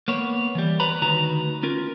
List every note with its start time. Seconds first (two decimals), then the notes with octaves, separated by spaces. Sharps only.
0.08 A#3 B3 C#5
0.55 E3 G3
0.80 B4 C#5 A#5 B5
1.02 D2 D#3 F#4 B4 A#5
1.63 C#4 F4 A#4